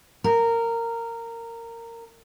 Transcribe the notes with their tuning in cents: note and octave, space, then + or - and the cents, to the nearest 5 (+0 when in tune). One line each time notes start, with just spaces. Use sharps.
A#4 -15